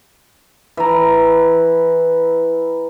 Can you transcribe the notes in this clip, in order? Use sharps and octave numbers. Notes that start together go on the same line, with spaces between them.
E3 A#5